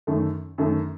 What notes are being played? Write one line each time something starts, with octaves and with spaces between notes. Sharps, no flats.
F#2 D#3 A3
F#2 D#3 A3